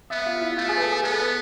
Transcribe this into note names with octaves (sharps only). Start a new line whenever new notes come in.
B3 E5
F4
E4
A3 F4
G#4
B4
A4
G#4
B3 A4
B4